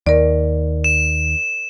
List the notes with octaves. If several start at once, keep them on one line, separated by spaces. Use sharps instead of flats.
D#2 A#4 D5
E7